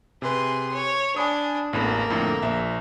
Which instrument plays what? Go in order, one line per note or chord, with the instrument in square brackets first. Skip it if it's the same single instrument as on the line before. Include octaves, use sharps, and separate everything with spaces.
[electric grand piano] C3 B4 [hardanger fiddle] G#4 C6
[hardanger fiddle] C#5
[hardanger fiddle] D4 [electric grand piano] G#5 B5 D#6
[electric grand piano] A1 E2 B5 [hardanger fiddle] A#3
[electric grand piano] F2 A2 D3
A#1 E5